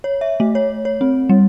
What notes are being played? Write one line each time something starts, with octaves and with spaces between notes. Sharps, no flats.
C#5
E5
A3
C#5
C#5
C4
G3